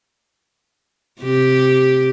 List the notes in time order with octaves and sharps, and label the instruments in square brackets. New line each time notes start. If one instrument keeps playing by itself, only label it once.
[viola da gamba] C3 G4